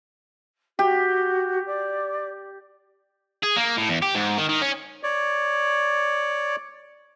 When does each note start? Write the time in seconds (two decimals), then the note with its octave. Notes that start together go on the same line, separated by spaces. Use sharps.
0.79 F#4 G4
1.66 D5
3.43 G#4
3.57 A#3
3.78 A2
3.89 E2
4.02 G4
4.15 G#2
4.38 D#3
4.49 D#3
4.62 C#4
5.03 C#5 D5